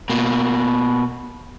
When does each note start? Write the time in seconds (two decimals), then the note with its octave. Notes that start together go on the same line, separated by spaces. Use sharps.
0.10 B2 A#3